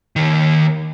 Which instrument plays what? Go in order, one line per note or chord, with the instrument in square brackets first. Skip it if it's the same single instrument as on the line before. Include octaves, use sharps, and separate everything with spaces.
[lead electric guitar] D#2 D#3